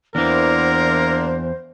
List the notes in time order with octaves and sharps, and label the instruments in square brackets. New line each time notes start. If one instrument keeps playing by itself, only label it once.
[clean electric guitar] E2 E3 [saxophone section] A#3 D4 [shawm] A#4 [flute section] C5